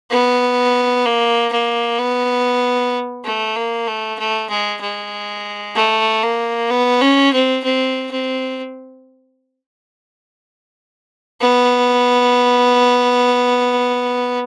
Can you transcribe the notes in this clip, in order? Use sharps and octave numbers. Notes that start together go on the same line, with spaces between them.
B3
A#3
A#3
B3
A3
A#3
A3
A3
G#3
G#3
A3
A#3
B3
C#4
C4
C4
C4
B3